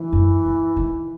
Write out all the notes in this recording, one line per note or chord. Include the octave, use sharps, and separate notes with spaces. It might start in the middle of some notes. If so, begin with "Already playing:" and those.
Already playing: E3
F#2
F#2
D#3